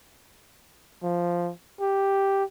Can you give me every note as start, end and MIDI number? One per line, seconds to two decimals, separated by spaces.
1.03 1.52 53
1.80 2.44 67